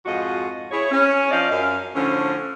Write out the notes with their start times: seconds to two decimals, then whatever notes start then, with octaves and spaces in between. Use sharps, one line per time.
0.05 F2 G#2 F4 F#4 D#5
0.71 E4 G#4 C#5
0.91 C#4
1.31 F3 C#4 D#4 D5 D#5 F5
1.50 F#2 F5
1.94 A2 D3 F3 C#4